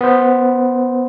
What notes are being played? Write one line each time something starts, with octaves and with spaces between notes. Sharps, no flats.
B3 C5